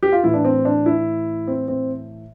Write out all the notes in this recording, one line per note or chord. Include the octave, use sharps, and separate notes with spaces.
G4
F4
A2 E3 E4
D4
C4
D4
E4
C4
C4